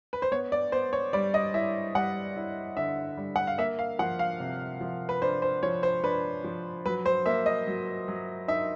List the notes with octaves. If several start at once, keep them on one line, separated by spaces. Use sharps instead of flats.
B4
C5
B3 C#5
D5
B3 C5
C#5
G3 D5
D#5
E4 E5
G3 F#5
E4
D3 E5
G3
F#5
F5
A#3 E5
F5
F3 F#5
F5
C3
F3
B4
D4 C5
C5
F3 C#5
C5
D4 B4
F3
F#3 B4
C5
A#3 E5
D#5
F#3
F#3
D#4 E5